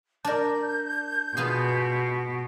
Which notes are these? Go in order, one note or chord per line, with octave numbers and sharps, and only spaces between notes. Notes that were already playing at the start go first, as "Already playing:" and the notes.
D4 A#4 D5 A5 G6
B2 B3 F4 G#4